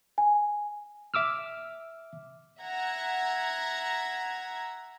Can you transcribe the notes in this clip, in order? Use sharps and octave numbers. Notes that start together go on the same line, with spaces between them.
G#5
E5 D6 E6 F6
E5 F#5 A#5 G#6